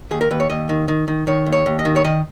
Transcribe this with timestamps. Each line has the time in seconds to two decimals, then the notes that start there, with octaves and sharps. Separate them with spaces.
0.11 D#2 G#4
0.21 A#4
0.31 D#2 B4
0.40 C#5
0.50 D#2 D#5
0.69 D#3
0.88 D#3
1.08 D#3
1.27 D#3 C#5
1.46 D#2
1.52 C#5
1.66 D#2
1.79 D#5
1.85 D#3
1.96 C#5
2.04 D#3 D#5